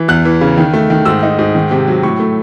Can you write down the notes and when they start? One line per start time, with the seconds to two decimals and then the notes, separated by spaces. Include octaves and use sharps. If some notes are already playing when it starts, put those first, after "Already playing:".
Already playing: E3
0.08 E2 F#6
0.25 E3
0.41 C#3
0.57 D#3
0.73 A3
0.90 D#3
1.05 G#2 E6
1.23 D#4
1.39 G#2
1.55 D#3
1.71 C3
1.87 F#3
2.03 A2 C#6
2.20 A3